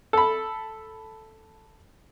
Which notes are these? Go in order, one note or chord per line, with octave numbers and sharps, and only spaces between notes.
A4 B5